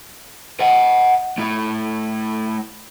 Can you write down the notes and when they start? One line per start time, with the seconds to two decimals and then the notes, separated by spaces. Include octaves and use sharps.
0.60 D#5 F#5
1.38 A3 E4